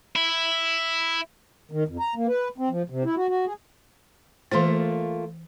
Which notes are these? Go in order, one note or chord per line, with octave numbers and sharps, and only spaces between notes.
E4
D#3
F2
A#5
A#3
B4
C4
F3
C3
E4
F#4
F#4
G#4
E3 A3 A#3 F4 C5